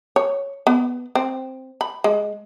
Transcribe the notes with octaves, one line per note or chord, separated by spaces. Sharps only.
C#5
B3
C4
B5
G#3